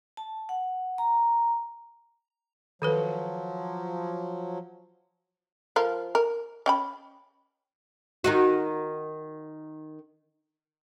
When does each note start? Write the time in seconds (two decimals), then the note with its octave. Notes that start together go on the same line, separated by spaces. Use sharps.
0.17 A5
0.49 F#5
0.98 A#5
2.82 D#3 F3 F#3 A4 B4
5.76 F3 F4 A#4
6.15 A#4
6.66 C#4 G5 B5
8.24 D#3 D#4 F#4